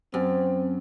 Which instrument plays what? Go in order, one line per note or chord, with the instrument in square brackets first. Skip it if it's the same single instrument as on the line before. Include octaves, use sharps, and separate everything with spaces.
[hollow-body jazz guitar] F#2 [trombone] C4